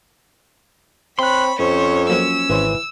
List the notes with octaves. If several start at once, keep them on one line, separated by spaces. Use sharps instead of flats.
C4 C#5 B5 C6 F#6
F2 C#4 C5 C#5
F3 F#3 A#3 C#4 E6
G#1 E3 C5 C#5